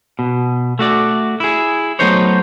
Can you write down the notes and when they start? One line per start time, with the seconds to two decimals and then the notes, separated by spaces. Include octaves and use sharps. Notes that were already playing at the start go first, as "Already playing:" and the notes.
0.19 B2
0.79 A3 F#4 D5
1.40 E4 G#4
1.99 F#3 A3 B3 D#4 C5 C#5